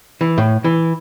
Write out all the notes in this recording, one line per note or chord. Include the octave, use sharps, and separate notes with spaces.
E3
A2
E3